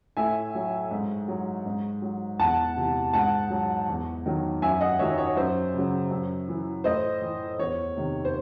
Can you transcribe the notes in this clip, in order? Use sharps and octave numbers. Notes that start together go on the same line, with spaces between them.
A2 E5 G#5
F#3
G#2
F#3
G#2
F#3
E2 F#5 A5
C3 E3
G#2 F#5 A5
F#3
E2
D#3 F#3
F#2 E5 G#5
D#5 F#5
D#3 F#3 C#5 E5
C#5
F#2 C5
C#3 F#3
F#2
E3
A2 C5 D#5
E3
E2 C#5
C3 D#3
C5